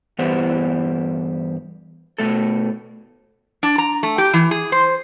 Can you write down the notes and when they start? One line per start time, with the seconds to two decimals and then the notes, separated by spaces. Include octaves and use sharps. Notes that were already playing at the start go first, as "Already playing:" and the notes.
0.19 G2 E3 B3 G4 C5 F#5
2.18 B2 A3 A4
3.63 D4
3.78 A#5
4.03 A3
4.18 G4
4.34 E3
4.51 G#4
4.72 C5